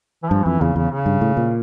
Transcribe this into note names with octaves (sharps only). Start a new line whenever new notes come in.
E3
G2 F3
F2 E3
E2 C#3
E2 C#3
C#3
G2
A2
A#2